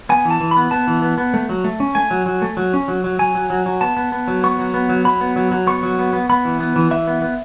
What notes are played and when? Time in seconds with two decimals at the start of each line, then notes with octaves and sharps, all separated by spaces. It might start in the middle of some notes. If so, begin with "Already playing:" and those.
0.09 B3 G#5
0.25 E3
0.31 A5
0.41 E3
0.51 B5
0.56 B3
0.71 B3 A5
0.87 E3
1.02 B3
1.18 B3
1.34 A3
1.49 F#3
1.64 A3
1.80 C#4
1.95 A3 G#5
2.11 F#3
2.26 F#3
2.42 A3
2.57 F#3
2.74 C#4
2.88 F#3
3.04 F#3
3.19 F#3 G#5
3.35 F#3
3.50 F#3
3.66 F#3
3.81 B3 A5
3.97 B3
4.12 B3
4.28 F#3
4.43 B3 C#6
4.59 F#3
4.74 B3
4.89 F#3
5.05 F#3 B5
5.21 B3
5.36 F#3
5.51 F#3
5.67 B3 C#6
5.83 F#3
5.99 B3
6.13 B3
6.29 B3 B5
6.45 E3
6.60 B3
6.76 E3
6.91 E3 E5
7.07 B3
7.22 B3